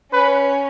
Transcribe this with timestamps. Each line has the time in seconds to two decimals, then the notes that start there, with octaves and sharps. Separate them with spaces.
0.12 C#4 B4